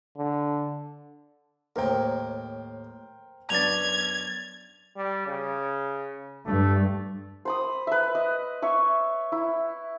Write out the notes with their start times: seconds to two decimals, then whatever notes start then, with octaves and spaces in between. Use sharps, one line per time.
0.17 D3
1.76 D#2 A2 A#4 C5 G5
3.50 F#2 B3 D4 G#6 A6 F7
4.97 G3
5.27 C#3
6.46 G2 A3
7.45 C5 B5 D#6
7.87 B4 E5
8.15 D#5
8.62 C#5 E5 C#6
9.32 E4